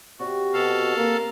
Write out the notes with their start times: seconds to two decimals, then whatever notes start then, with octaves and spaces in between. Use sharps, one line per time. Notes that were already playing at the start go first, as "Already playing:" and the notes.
0.19 C3 F#4 D5
0.53 B2 A4 F5
0.97 A#3 A#4